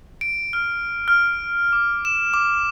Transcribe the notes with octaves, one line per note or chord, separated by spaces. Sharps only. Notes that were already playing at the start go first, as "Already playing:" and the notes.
D7
F6
F6
D6
E7
D6